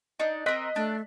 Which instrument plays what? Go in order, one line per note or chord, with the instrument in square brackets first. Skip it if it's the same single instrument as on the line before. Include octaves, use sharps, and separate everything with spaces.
[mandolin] D4 D#4
[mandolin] C4 A#4 [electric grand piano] D#5 F#6 B6
[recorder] A3 [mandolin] D4